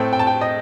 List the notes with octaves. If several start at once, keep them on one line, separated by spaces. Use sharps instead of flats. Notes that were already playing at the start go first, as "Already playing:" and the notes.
Already playing: A2 A3 C4 G5
G5
A5
G5
D#5